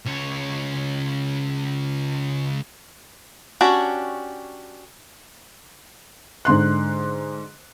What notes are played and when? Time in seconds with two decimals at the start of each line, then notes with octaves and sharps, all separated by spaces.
0.06 C#2 C#5
3.61 C#4 D4 F#4 G4
6.45 G#2 D3 C6 F#6